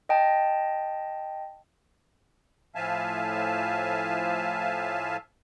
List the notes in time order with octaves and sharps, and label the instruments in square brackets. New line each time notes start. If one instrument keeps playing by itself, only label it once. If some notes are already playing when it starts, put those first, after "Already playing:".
[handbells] D#5 G5 A5
[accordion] A2 F3 E5 F5 G#5 A5